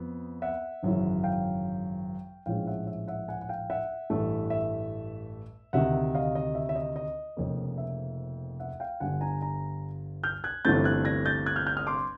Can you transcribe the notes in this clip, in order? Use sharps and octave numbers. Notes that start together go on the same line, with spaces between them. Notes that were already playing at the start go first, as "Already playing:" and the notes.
Already playing: F2 B3
E5 F#5
G#1 F#2 C#3 E3
F5 G5
A#1 A2 F3 G#3 C#4 F5 G5
E5 F#5
E5
E5 F#5
F#5 G#5
F#5
F5 G5
E5 F#5
A1 G2 E3 A3
E5
D2 C3 D#3 E5 F#5
D#5 F5
D#5
E5
E5
D#5
D#5
F1 F2 C#3 F3 A#3
E5
E5 F#5
F5 G5
G1 G2 D3 F#5 G#5
G#5 A#5
G#5 A#5
F6 G6
F#6 G#6
G1 G2 E3 A3 C4 G6 A6
F#6 G#6
G#6 A#6
G6 A6
F#6 G#6
F6 G6
F6 G6
D#6 F6
C6 D6